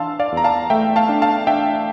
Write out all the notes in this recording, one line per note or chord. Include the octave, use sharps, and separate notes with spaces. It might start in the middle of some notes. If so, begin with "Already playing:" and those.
Already playing: E3 D4 F5 A5 C6 E6
D5 F5
E2
A#5
F5 A5
A3 E5 G5
F5 A5
D4
F5 A5
D4 E5 G5